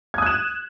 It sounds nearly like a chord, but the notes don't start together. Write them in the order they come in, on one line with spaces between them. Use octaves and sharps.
G#6 D#6 F#6 E7